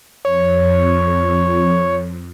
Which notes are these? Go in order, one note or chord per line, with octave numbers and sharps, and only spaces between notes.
F2 C#5